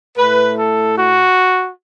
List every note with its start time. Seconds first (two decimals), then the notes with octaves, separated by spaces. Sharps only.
0.17 A2 A3 B4
0.57 A4
0.97 F#4